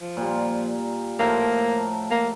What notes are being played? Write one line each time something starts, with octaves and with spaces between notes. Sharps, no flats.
F3
A#2 G3
A2 F3 A#3 A#4
A#3